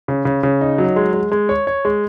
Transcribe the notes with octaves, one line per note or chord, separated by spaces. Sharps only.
C#3
C#3
C#3
D#4
F#3
G#3
G#3
G#3
C#5
C#5
G#3